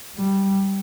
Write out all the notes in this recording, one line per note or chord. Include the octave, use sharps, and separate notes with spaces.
G3